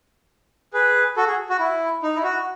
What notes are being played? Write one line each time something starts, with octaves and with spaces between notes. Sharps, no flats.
G#4 B4
F#4 A4
G#4
F#4
E4
D#4
E4
F#4